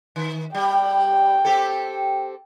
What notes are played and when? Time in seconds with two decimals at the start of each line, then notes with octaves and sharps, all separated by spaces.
0.16 D#3
0.55 G3 G5
1.45 C4 G4 A4